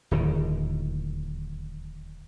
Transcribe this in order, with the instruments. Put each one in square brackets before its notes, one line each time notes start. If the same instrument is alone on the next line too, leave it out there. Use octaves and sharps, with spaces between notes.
[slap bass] D1 D#2 D#3